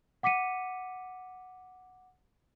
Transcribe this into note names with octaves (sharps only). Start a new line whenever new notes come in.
F#5 D6 B6 C#7 D#7